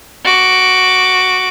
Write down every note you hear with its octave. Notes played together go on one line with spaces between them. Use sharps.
F#4 D6